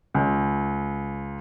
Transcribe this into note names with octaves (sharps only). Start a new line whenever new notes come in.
C#2